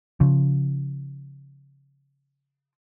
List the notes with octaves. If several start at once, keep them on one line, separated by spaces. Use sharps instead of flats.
C#3 F3